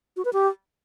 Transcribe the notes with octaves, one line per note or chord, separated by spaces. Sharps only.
F#4
B4
G4